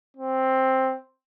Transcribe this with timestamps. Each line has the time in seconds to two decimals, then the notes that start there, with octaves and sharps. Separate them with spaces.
0.17 C4